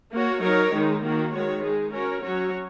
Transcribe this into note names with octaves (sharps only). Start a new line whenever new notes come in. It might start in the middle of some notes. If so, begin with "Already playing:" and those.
A#3 F#4 C#5
F#3 D#4 A#4 C#5
D#3 G#3 D#4
D#3 A#3 F#4
D#3 G#3 F#4 C#5
G#3 D#4 G#4
C#4 F#4 A#4 C#5
F#3 C#4 F#4 C#5